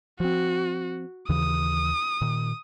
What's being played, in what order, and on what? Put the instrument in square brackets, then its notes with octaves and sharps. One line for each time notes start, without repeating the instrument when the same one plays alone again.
[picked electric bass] F3 C4 [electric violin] F#4
[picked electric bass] D#2 C#3 E3 [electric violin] D#6
[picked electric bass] A#2 D#3